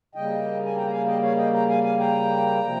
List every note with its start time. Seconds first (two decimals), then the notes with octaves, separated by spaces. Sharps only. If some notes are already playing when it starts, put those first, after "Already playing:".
0.15 C#3 G3 A#3 D#5 G5
0.65 G#5
0.76 G5 A#5
0.87 A#5
0.91 F5 G#5
1.07 D#5 G5
1.22 C#5 F5
1.37 D#5 G5
1.53 G5 A#5
1.69 F5 G#5
1.84 F5 G#5
1.99 G5 A#5
2.61 C3 F3 A#3